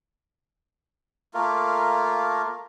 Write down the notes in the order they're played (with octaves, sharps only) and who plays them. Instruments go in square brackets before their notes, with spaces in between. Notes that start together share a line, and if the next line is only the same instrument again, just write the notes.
[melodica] A3 A#3 F4 A#4